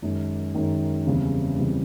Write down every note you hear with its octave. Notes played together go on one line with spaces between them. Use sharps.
F#2 D#3 G#3
F#2 D#3 G#3
E2 C#3 E3 G3 C4
C#3 E3 G3 C4